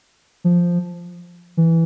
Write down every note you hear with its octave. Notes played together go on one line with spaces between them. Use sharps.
F3
E3